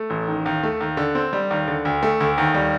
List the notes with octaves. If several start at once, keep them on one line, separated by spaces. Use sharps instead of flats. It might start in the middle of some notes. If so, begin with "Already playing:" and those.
Already playing: A3
A1
D#3
D#2
A3
D#2
D3
C4
G3
D#2
D3
D2
A3
D2
D#2
G3